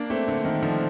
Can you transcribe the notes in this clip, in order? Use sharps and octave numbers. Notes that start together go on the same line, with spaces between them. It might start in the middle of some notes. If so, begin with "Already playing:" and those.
Already playing: A#3 D4
A3 C4
D3
D#3
D3 F3